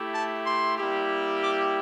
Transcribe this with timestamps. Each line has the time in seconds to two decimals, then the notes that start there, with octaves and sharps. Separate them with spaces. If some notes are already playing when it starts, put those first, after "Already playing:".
Already playing: A3 E4 G4
0.14 A5
0.45 C6
0.78 G3 A#3 E4 G4
1.41 D6